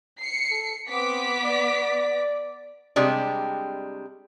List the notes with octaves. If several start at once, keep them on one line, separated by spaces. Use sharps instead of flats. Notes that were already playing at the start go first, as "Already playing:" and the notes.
C7 C#7
A4
B3 C4 D6 B6
D5
C3 G3 G#3 D4